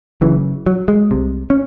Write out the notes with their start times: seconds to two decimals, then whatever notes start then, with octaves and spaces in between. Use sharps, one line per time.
0.21 F#1 F#2 C#3 E3
0.66 F#3
0.88 G#3
1.11 C2 C3
1.50 C#4